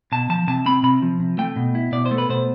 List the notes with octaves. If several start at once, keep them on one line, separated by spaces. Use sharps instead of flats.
B2 A5
F3 A5
C3 A5
C4 B5
C3 B5
F3
C3
A3 G5
B2
E4
B2 D5
C5
A3
B4
B2 C5